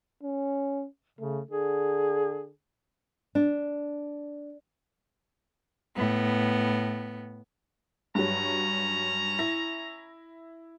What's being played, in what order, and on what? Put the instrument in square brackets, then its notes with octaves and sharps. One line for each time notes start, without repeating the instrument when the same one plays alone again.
[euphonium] C#4
[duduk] C#3 [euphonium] A3
[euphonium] D3 [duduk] G#4
[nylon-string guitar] D4
[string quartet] A2 B3
[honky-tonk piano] G2 F#3 [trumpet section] C#4 A#5
[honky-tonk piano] E4 A#6